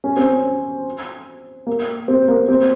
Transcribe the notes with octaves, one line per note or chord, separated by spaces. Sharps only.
C#4
C4
C#4
A#3
C4
A#3
C4